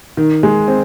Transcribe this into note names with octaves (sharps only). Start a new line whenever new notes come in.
D#3
G#3
C4